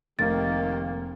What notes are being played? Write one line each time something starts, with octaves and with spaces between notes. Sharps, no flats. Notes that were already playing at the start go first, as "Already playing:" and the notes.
F1 D#3 A#3 G4 A6